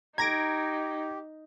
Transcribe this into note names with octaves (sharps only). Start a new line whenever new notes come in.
D#4 G4 A#5 G#6 A#6 D7